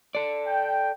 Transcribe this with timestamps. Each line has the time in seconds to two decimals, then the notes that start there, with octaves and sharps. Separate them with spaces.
0.15 A4 D5
0.46 G5